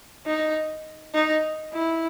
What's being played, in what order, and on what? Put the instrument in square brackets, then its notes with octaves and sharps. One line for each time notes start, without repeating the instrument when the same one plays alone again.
[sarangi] D#4
D#4
E4